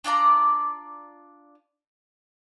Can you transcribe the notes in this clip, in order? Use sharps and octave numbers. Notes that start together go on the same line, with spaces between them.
D4 F4 D5 A#5